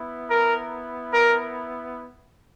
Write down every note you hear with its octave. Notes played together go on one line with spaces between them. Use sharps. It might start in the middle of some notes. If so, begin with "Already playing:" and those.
Already playing: B3 E4
A#4
A#4